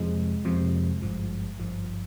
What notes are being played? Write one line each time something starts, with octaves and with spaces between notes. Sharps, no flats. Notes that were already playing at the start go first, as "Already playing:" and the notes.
Already playing: F2 C3 F3 G#3
F2 C3 F3
G#1 G2 F3
G#1 G2 F3